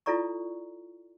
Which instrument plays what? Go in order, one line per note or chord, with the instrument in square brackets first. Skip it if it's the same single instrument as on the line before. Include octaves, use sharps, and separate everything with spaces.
[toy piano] E4 F4 A4 D5 A#5 C#6